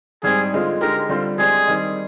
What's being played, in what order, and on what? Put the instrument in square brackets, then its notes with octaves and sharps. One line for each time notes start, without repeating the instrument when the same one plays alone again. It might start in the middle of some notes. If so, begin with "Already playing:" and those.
[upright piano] G#2 G3 C4 [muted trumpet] G#4
[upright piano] D3 G#3 C4 F4
[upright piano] D3 G#3 D#4 G4 [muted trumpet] A#4
[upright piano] D3 G3 C4 F4 C5
[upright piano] G#3 C4 G4 D5 [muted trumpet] G#4
[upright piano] D#3 G3 C4 D#4